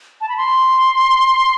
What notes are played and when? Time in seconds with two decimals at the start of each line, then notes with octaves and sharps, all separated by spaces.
0.21 A5
0.29 B5
0.37 C6